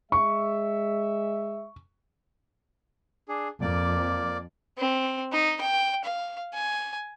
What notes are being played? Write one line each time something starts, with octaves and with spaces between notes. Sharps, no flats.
G#3 E5 C#6
D4 G#4
F2 A#3 D5 D6
C4
D#4
G5
F5
G#5